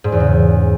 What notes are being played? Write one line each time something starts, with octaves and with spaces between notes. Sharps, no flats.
G#2
E2
C#3